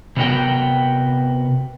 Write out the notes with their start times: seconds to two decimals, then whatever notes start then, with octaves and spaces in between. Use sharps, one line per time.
0.17 C3 B3 D4 F#4 A#4 G5